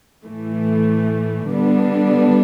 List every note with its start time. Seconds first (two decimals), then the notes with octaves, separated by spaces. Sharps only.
0.25 A2 E3 A3
1.49 D3 G3 B3 D4